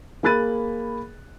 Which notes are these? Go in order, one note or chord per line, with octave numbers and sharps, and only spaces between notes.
A#3 G#4 B5 F#6 A6 D#7